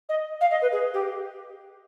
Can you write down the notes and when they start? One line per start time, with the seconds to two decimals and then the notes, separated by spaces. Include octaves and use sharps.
0.09 D#5
0.40 F5
0.51 D#5
0.61 B4
0.72 G#4
0.93 G4